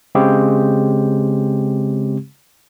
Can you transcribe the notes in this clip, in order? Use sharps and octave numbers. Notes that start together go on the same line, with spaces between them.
C#3 G#3 C4 G4